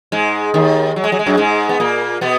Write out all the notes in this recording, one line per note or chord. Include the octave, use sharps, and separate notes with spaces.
G#2 G#3
D#2 D#3
F#3
G#3
F#3
G#3
F#2 F#3
G#2 G#3
B3
A#2 A#3
B2 B3